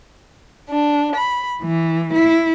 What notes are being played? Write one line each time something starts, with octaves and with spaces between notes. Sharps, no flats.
D4
B5
E3
E4